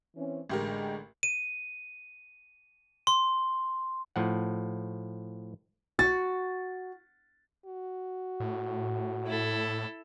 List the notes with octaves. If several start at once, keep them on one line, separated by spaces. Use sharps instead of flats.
E3 C4 C#4
A1 D3 G#3 G4 A#4
D#7
C6
A2 F3 F#5
F#4 A6
F#4
A2
E4 A4